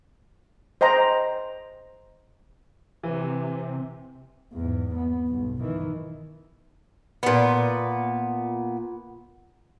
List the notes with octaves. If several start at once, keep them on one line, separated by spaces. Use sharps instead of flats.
C5 D#5 G5 A#5
C3 E3
E2 G#2
B3
B1 G2
D#3 E3
A#2 B3